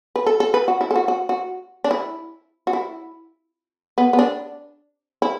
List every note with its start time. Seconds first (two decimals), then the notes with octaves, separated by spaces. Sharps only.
0.16 B4
0.26 A4
0.40 A4
0.54 B4
0.68 F#4
0.81 E4
0.91 A4
0.96 F#4
1.08 F#4
1.29 F#4
1.84 D4
1.91 E4
2.67 F#4
2.73 E4
3.98 B3
4.13 B3
4.19 D4
5.22 E4